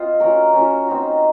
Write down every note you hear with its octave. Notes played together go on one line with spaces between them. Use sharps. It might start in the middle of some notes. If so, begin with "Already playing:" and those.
Already playing: C4 F4 C5 D#5
C#4 F#4 A#4
C#4 F#4 A#4
C4 D#4 F#4